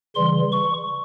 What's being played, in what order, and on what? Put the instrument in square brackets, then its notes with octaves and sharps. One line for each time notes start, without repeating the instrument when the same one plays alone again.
[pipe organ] C#3 E3 G3 C6
C#6